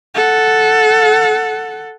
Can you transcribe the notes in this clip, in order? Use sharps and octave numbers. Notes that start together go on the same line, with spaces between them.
A4 F#5